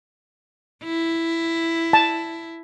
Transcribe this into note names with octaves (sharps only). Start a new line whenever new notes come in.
E4
A5